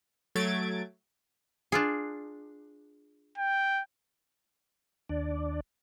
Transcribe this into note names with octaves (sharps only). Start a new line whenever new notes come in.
F#3 A3 G#6 A6 D7
D4 F4 G#4
G5
D#2 D4 D5